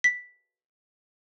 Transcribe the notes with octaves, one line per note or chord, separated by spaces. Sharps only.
B6